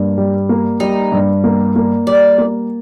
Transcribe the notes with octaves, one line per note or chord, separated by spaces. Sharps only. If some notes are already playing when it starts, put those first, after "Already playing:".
Already playing: G2 A#3
G3
A#3
G3 D#4
G2
A#3
A#3
G3 D5
A#3